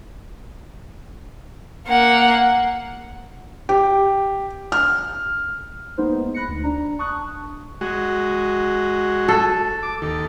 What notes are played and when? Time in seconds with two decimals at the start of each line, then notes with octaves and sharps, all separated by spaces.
1.88 A#3 F#5
3.69 G4
4.72 F6
5.98 G#3 A#3 B3 D#4 C5
6.34 B5 F#6 A#6 C#7
6.48 D2
6.64 D4 A#5
6.99 A5 C#6 D#6 F#6
7.81 G#3 F#4
9.28 A4
9.83 D6
10.02 D#2 A4